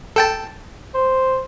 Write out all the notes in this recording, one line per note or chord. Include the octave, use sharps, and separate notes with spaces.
A4 G5 A5
C5